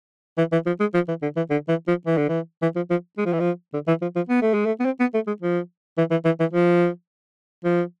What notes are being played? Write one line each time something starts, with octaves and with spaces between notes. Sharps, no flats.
E3
E3
F3
G#3
F3
E3
D3
E3
D3
E3
F3
E3
D3
E3
E3
F3
F3
G#3
F3
E3
F3
D3
E3
F3
F3
B3
A3
G#3
A3
B3
C4
B3
A3
G#3
F3
E3
E3
E3
E3
F3
F3